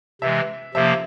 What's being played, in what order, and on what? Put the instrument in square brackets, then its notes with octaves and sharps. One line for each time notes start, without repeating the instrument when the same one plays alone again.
[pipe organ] C3 E3 G#3 [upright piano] E5
[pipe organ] C3 F3 A#3 [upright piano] E5